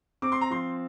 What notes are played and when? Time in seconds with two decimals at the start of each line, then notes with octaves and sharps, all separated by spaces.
0.22 C4 D6
0.32 C6
0.41 A#5
0.50 F3 C6